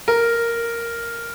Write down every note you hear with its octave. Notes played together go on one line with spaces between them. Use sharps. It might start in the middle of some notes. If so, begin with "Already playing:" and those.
A#4